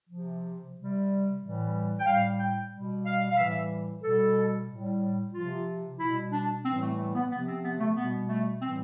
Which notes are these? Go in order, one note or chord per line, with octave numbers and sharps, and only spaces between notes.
C3 F3
C3 G3
A2 E3 G3
G5
A2 G3 F5
G5
B2 G3
F5
F5
A2 E3 G3 E5
B2 G3 A4
A2 G3
C3 F3 F4
B2 G3 E4
D4
A2 E3 G3 C4
A3
A3
B3
C3 F3 B3
C4
B3
A3
B2 G3 B3
A3
A2 E3 G3 C4